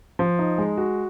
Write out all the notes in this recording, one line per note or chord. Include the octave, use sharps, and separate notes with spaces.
F3
D#4
G#3
F#4